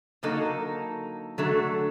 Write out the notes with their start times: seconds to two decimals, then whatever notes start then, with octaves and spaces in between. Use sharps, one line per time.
0.23 D3 F#3 A#3 D#4 A4
1.38 D3 F#3 A3 D4 A4